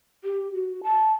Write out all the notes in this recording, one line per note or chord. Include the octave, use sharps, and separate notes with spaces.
G4
F#4
A5